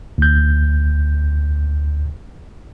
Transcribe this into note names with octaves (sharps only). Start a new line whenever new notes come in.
D2 G6